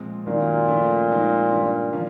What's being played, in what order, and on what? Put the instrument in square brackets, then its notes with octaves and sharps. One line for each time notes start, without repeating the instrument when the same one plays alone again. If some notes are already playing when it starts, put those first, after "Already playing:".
Already playing: [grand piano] A#2 F3 G#3 C4
[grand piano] F#2 D#3 F#3 A#3 [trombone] A#2
[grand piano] F3 A3 C#4 E4
F3 G#3 C4 D#4
G2 E3 G3
D3 F3 A#3 C#4 F4